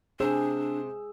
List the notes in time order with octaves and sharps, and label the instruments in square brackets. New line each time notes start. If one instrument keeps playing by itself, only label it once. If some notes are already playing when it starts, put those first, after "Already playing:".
[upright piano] C3 C5 E6 [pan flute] D4 [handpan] G#4